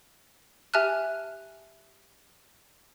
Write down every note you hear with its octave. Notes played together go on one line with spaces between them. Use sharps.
G4 E5 G#5 A5 F6 F#6